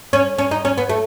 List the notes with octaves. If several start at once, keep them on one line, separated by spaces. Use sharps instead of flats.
C#4
C#4
D#4
C#4
B3
A3